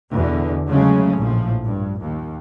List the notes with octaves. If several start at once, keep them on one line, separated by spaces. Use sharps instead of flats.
E2 B2 D3
C#3 F#3 G#3 A3 C#4
A#1 A2 F3
G2
D#2